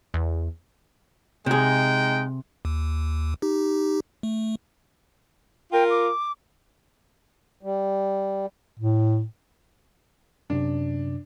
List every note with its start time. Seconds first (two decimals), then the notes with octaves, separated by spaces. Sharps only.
0.14 E2
1.46 C3 G#3 D#4 G#4 G5
2.65 D#2
3.42 D#4 G4
4.23 A3
5.72 F4 A#4 G5
5.90 D6
7.63 G3
8.79 A2
10.50 F#2 C3 D4